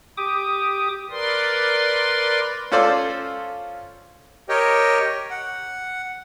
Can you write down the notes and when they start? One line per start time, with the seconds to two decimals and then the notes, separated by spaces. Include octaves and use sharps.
0.17 G4 D6 D#6
1.10 A#4 B4 D5 C6
2.72 C#4 F4 A4 C5 D5
4.49 G4 A#4 C#5 D#5 G5
5.31 F#5